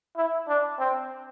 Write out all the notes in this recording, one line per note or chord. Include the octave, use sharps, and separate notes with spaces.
E4
D4
C4